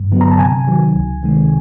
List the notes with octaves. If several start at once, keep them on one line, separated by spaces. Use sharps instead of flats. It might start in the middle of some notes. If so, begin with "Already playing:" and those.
Already playing: G2
D3 F#3 B3
A#5
A5
C3 G#5
D#3 F#3
C#2
C3 D#3 G#3